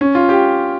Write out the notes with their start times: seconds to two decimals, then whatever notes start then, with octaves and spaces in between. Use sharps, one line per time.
0.01 C#4
0.15 F4
0.29 G4